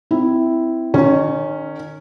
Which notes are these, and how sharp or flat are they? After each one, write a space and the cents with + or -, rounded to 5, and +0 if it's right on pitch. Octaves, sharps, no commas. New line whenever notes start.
C4 -20 E4 +0
D#3 -35 C#4 +0